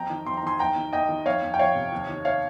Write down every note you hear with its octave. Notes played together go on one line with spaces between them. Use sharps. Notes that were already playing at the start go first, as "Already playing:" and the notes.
Already playing: F2 G5 A#5
D#3
F2 C6
A#5
D#3 G#5 C6
D#2 G5 A#5
D#3
D#2 D#5 G5
D#3
F2 C#5 F5
F2
G5
F3 C#5 F5
C3
D#2
D#3
C#5 F5